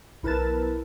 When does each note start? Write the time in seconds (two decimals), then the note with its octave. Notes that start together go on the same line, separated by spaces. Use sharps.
0.23 B1 E4 A#4 B4 A5 A6